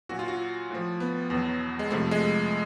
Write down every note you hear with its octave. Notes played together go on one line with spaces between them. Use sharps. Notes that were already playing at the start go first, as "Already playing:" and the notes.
A#2 F#3 F#4
F4
F#4
A2 F3
B3
E2 B2 F#3
G#3
F2 C3 F3 A3
G#3